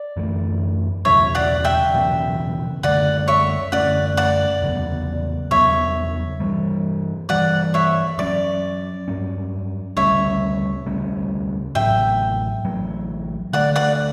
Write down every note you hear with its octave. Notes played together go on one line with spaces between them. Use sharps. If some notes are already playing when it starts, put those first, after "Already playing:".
Already playing: D5
F#2 E3 A3
E1 E2 C#3 F#3 C#5 E5
D5 F#5
E5 G5
E1 E2 C#3 F#3
F#2 D3 A3 C#4 D5 F#5
C#5 E5
F#2 D3 A3 C#4 D5 F#5
D5 F#5
E2 C#3 F#3 B3
E2 C#3 F#3 B3 C#5 E5
G2 E3 G3
G2 E3 G3 D5 F#5
C#5 E5
G2 F#3 C#4 D5
G2 F#3 C#4
D2 C#3 G3 C#4 C#5 E5
D2 C#3 G3 C#4
A1 A2 F#3 E5 G5
A1 A2 F#3
D2 D3 A3 D5 F#5
D5 F#5